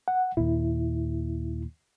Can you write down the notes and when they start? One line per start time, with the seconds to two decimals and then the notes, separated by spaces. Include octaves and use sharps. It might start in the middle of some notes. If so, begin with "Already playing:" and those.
0.08 F#5
0.37 D#2 A#2 E4